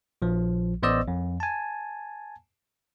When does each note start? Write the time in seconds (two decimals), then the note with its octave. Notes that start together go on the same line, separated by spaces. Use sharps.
0.22 A#1 F3
0.82 A1 B3 C5 D5 D#5 E6
1.08 F2
1.40 G#5 A5